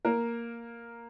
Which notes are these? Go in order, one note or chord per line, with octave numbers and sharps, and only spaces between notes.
A#3 A#4